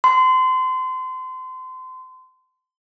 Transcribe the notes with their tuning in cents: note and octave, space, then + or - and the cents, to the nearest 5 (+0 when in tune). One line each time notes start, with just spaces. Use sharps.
C6 -30